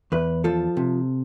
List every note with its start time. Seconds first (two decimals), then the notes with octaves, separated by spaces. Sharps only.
0.12 E2 B4
0.44 F3 A4
0.77 C3